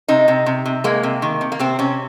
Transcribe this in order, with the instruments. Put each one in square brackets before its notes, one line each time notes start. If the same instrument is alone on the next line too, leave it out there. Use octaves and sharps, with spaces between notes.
[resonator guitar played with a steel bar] C3 D#4
C3
C3
C3
G#3 A#3
C3
D#3
C3
A#3
C3 C4
C3 C#4